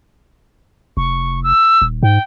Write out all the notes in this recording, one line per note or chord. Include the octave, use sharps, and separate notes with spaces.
F1 C#6
E6
D#1
G#2 G5